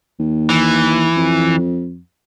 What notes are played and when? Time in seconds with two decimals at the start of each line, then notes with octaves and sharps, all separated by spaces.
0.19 D#2
0.50 E3
1.16 F2